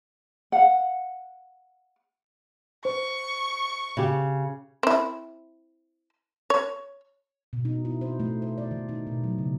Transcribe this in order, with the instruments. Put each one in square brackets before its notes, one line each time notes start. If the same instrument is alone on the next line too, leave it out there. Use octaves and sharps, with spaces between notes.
[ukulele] F5 F#5
[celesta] C5 [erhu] C#6
[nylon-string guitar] C#3 G4
[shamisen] C4 E4
C#5
[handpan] B2
D#4
E4
C5
A3
C5
D5
D#3
D#4
B2
F#3
C#3